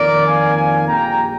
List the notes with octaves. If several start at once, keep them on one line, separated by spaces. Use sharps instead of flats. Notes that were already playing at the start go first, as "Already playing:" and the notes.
Already playing: F2 D#3 A#3 A#4 D5
F5 G#5
F5 G#5
A#1 A#2 G3 G5 A#5